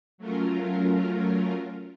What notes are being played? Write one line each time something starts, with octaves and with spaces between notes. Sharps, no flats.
F#3 A3 C#4 F4 A#4